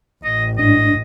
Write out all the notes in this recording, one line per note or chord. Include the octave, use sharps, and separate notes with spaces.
A1 D#5
G#2 D4 D#5